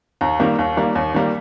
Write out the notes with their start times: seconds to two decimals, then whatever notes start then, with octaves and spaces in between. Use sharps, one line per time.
0.21 D#2 A#5
0.40 D#3 G3 A#3
0.59 D#2
0.77 D#3 G3 A#3
0.95 D#2
1.14 D#3 G3 A#3